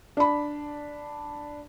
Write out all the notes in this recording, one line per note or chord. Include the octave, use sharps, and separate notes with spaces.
D4 B5